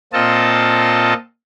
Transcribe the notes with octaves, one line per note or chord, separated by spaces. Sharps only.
A#2 C4 F4 A4 D#5 A5